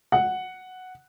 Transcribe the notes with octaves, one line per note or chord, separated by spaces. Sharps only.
F#5